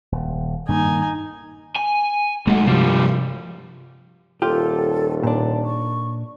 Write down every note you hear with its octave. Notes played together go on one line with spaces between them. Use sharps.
D#1
G2 D#3 A#3 D#4 G#5
G#5
B1 F#3 G#3 A3
G2 C3 F3 G3
D#1 F4 G4 A4
A#2 D4 C#5
C#6